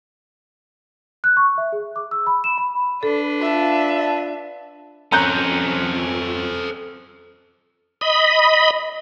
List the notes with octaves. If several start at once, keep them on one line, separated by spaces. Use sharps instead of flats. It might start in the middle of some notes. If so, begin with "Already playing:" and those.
F#6
C#6
E5
G#4
D6
E6
B5
E7
B5
D4 A4 B4
F4 E5 A5
F2 C#4 A4 C5 A#5 F#6 G6
D#5 B5